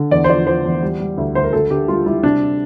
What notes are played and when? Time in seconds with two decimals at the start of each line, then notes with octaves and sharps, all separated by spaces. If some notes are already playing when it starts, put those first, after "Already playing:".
Already playing: D3
0.11 E2 D5
0.24 C5
0.29 F3 D5
0.47 F3 C5
0.65 E2
0.82 G3
1.00 G3
1.18 D2
1.35 D2 C5
1.44 A#4
1.53 D2 A4
1.70 D3 G4
1.88 G3 F4
2.06 G3 E4
2.23 C3 D4